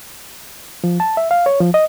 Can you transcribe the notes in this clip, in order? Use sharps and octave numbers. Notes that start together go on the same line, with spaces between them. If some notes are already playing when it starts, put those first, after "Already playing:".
F3
A5
E5
F5
C#5
F3
D#5